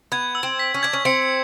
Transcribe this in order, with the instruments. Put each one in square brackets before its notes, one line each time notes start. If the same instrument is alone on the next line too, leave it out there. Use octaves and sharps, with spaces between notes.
[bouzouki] B3 [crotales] G#6
[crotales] E6
[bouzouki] C4
[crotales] B6
[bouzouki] C#4
[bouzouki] D4 [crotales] G#6
[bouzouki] C#4
[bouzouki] C4 [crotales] C#7